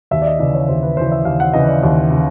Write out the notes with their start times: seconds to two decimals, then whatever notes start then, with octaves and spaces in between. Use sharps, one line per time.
0.11 D#2 E5
0.22 D5
0.26 D#5
0.39 C#3 E3 D5
0.55 C#5
0.68 D#2 C5
0.82 B4
0.97 C#3 E3 C5
1.12 E5
1.25 D#2 F5
1.40 F#5
1.53 C#3 E3 D#5
1.67 D5
1.83 D#2
2.10 C#3 E3